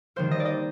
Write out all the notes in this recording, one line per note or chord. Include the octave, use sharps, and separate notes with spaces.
D#3 G3 A#3 C5
D#5
D5
D#5